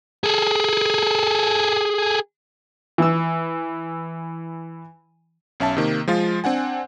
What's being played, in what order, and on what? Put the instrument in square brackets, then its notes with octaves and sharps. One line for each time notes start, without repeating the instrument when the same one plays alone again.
[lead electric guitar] G#4 A4
[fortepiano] E3 E6
[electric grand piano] B1 C#4 E5 A5
C3 D#3 A#3
F3 G#3 F4
C4 D4 F#5 G#5